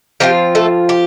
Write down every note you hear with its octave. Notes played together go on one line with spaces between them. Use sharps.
F3 C4 F4 G4 G5
A3 A4
G4